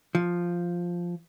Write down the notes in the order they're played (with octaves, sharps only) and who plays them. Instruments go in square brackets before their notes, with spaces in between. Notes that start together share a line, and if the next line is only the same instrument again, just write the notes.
[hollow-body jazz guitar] F3